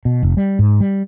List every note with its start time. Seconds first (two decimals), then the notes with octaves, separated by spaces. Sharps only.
0.05 B2
0.23 F1
0.37 G3
0.59 G#2
0.80 G3